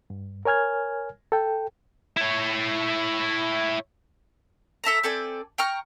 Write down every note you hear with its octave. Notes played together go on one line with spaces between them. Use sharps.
G2
A#4 C#5 G#5 F6 G#6
A4 G5
E4 C#5
A4 E5 A5 A#5
C4 A4 D5 G#5
G5 A#5 C#6 F6